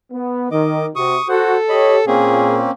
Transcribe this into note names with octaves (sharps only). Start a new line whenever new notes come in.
B3
D#3 D#5 D6
C3 F#4 C#6 D#6
F#4 A4 C5 F#5
G4 C#5 D#5 B5
A#2 A#3 C4 C#4 G#4